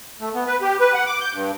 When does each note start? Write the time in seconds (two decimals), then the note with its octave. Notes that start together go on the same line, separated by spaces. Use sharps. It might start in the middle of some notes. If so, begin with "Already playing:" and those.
0.21 A3
0.35 B3
0.47 B4
0.62 G4
0.80 B4
0.94 F#5
1.07 D6
1.21 G6
1.33 G2